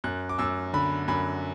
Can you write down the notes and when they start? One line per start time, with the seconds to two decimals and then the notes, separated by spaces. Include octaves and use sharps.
0.04 F#2 F#6
0.29 D6
0.38 F#2 E6
0.73 D3 B5
1.08 F#2 B5